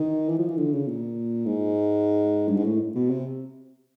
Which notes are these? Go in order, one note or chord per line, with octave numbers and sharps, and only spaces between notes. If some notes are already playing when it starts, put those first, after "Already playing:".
Already playing: D#3
E3
F3
E3
D3
C#3
A#2
G#2
G2
G#2
A2
B2
C3